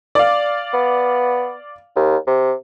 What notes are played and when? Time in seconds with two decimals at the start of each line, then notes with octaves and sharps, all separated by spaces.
0.15 D5 F5
0.73 B3
1.96 D#2
2.27 C3